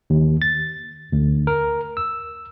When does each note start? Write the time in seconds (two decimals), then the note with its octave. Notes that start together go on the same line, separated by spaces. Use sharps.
0.10 D#2
0.42 A6
1.12 D2
1.47 A#4
1.97 E6